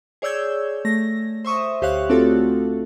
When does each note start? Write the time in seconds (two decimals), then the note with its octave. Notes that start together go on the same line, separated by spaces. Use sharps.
0.22 G#4 C#5 D5 E6 G6 G#6
0.85 A3 A#6
1.45 C5 E5 C#6 D#6
1.82 D2 G4 C5 C#5 F5 F#6
2.09 A3 C4 D4 F4 F#4 A4